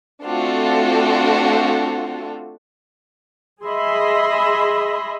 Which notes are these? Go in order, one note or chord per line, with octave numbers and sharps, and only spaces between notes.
A3 C4 D4 F4 F#4 A4
G#4 D#5 E5 B5 C6